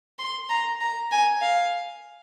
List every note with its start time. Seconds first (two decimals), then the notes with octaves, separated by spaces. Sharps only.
0.19 C6
0.49 A#5
0.81 A#5
1.11 G#5
1.41 F5